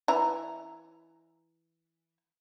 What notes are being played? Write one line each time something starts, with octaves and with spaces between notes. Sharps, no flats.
E3 E5 A#5